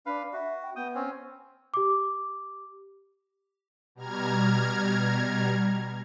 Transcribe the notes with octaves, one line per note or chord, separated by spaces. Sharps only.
D4 B4 F5
F#4 E5
G5
B3 G5 D#6
C4 C#4
G4 D6
B2 G3 A#5 F6 G#6